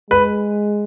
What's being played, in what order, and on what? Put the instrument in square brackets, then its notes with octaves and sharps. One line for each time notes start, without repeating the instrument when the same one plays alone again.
[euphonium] G#3 [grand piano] B4